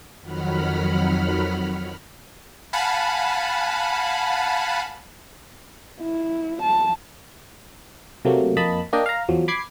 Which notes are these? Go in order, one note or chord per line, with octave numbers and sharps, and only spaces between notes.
F2 D#3 F#3 F#5 B5 F6
F5 F#5 G#5 A5 B5
E4
A5
C3 F#3 A3 A#3
F2 A#3 D#5 A5 B5
A#3 D4 D#5 G5
F5 A#5
E2 F3 F#3
B5 D6 G#6 C7